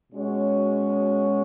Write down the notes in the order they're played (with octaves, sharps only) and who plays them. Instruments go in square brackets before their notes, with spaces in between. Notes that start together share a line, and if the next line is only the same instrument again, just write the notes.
[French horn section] B2 G#3 C#4 F#4 C#5